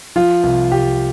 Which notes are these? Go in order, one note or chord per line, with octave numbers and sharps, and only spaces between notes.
F3 F4
C2
C2 G4